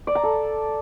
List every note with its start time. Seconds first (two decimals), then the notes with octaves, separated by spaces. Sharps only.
0.07 D5
0.15 A#5
0.23 A4